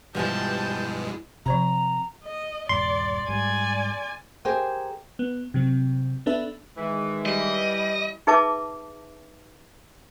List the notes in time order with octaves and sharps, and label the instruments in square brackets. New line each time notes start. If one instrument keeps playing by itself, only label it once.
[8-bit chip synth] G2 B2 G#3 [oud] E3 F3 G3 [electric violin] A5 G6
[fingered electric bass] C3 [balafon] F3 C5 B5 [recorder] A#5
[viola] D#5
[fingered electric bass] D#1 G2 [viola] D5 [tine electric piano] C6
[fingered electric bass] G#2 G3 [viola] D5 G#5
[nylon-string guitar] G4 G#4 A#4 C5 G5 G#5
[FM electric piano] B3
C3 F#3 C4
B3 D4 A4 B4 E5
[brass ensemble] D#3 G#3 [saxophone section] E3
[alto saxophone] G3 [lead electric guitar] D#5
[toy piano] D#4 G#4 B4 E5 A5 D6